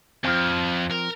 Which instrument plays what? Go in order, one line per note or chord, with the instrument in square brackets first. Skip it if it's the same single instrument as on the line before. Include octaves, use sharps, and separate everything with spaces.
[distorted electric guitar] F2 [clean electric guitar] F3 C4
[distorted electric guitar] A#4